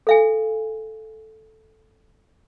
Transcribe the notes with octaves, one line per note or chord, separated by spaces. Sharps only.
A4 F5 G#5